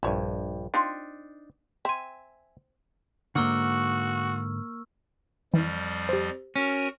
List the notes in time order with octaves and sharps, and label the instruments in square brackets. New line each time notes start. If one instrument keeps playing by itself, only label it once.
[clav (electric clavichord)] A#1 G2 [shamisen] E4 C#5
[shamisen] C4 F4 [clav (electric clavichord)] D4 D#4
[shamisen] C4 [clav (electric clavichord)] E5 G#5
[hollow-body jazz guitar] G#2 D3 [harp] A#3 D6 [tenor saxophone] F#4 [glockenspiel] C#6 E6 F6
[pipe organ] F2 F3 G3 [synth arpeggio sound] E3
[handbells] G4 C5
[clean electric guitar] C#4 [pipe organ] F#4 A#4